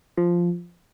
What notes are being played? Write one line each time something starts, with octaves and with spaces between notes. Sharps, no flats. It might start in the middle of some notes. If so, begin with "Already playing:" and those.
F3